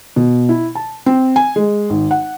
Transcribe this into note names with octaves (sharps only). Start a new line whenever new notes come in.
B2
E4
A5
C4
G#5
G#3
G#1
F#5